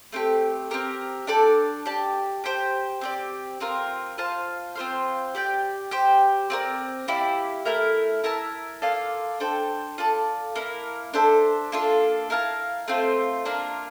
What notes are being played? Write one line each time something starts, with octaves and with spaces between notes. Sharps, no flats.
A3 C4 G4
C4 G4 A#4
D4 A4 D5 G5
G4 D5 A5
G4 C5 G5
C4 G4 D5
C4 F4 A#4
F4 C5 F5 A5
C4 F4 C5 F5
G4 D5 G5
G4 C5 G5
C4 F4 A#4 D5
A#3 E4 G4 D5
A3 E4 A#4
E4 A#4 E5 A5
A#3 F4 A4 D5
D4 A4 C5 G5
F4 A4 D5 A5
A#3 E4 A#4
D4 A4 C5 E5
A#3 D4 F4 A4
E4 A#4 F5 A5
A3 C4 F4 C5
A#3 D4 F4 A#4